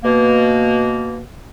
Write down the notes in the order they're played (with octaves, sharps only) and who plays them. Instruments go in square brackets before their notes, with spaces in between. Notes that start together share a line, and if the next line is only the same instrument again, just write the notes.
[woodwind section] B2 A#3